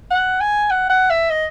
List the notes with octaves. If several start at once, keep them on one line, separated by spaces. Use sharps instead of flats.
F#5
G#5
F#5
F#5
E5
D#5